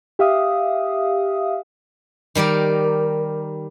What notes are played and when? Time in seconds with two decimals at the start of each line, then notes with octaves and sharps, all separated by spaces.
0.19 G4 E5 F5 D#6
2.35 D#3 G3 G4 A#4